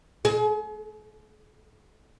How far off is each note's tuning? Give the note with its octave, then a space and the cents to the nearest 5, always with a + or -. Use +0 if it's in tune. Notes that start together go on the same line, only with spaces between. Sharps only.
G#4 +40